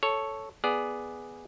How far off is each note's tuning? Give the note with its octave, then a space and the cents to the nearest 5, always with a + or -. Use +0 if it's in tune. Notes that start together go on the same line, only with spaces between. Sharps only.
A4 +0 C#5 +0
B3 +0 G#4 +0 D5 +0